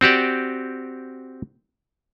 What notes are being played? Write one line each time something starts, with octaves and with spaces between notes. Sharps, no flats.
C4 F#4 G4 D5